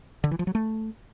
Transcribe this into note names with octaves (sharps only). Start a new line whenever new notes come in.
D3
E3
F3
F#3
A3